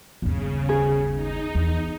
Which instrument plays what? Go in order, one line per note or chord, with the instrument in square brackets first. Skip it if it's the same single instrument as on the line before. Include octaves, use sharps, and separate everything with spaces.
[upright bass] G1 D#2 [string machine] C#3
[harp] G#4
[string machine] D#4
[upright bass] E2